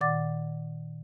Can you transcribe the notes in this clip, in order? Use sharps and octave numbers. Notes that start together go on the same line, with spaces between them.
A#2 D#3 D5 F#5 D6 A6